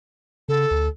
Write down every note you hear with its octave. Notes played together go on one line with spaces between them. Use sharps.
C#3 A4
D2